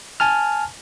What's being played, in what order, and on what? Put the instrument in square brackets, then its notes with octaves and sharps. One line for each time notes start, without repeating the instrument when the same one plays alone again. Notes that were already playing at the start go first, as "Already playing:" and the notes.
[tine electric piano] G#5 A5 F6